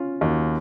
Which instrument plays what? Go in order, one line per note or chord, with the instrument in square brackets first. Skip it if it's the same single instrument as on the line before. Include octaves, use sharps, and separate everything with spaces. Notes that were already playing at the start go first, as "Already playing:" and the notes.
Already playing: [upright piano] C#4 F4
[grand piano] D#2 [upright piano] D#4 F#4